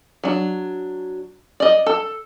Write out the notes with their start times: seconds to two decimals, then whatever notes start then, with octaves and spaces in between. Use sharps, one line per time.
0.24 F#3 D4
1.60 D5 D#5
1.86 A4